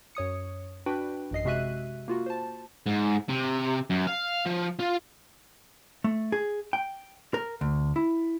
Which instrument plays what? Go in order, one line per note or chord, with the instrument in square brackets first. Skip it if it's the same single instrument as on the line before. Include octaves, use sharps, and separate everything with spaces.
[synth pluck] F#2 C#5 D#6 C#7
D4 F#4 B4 G5
A1 F#2 D#5 C7
C3 G#3 F#4 E5 F#6 D#7
A#3 F4 F#4
C5 A5
[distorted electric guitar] G#2
C3
F#2
F5
F3
F4
[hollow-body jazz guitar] A3
G#4
G5
A#4
D2
E4